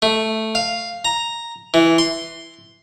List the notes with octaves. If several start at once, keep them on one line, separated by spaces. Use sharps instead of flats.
A3
F5
A#5
E3
C6